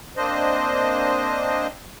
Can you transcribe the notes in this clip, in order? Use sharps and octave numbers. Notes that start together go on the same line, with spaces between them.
A#3 C4 D4 C5 D#5